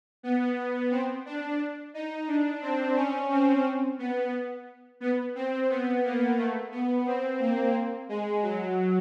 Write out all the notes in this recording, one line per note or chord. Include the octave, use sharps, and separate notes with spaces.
B3
C4
D4
D#4
D4
C4
C#4
C4
B3
B3
C4
B3
A#3
A3
B3
C4
A#3
G#3
F#3